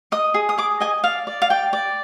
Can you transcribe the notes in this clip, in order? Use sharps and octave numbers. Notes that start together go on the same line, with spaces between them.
D#5 D#6
G#4
D#6
G#4 D6
D#5 G#5
D5 F5
D5
F5
D5 G5
D5